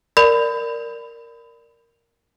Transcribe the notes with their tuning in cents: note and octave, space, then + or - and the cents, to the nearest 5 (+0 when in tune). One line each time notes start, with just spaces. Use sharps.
A#4 +0 D5 +0 B5 +25